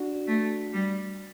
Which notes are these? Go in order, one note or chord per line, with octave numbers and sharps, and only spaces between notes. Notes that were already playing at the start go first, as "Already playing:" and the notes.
Already playing: D4 F#4
A3
G3